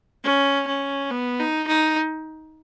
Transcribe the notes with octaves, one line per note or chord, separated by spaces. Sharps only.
C#4
C#4
B3
D#4
D#4